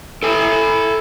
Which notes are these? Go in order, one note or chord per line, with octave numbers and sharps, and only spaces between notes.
E4 A4 G#5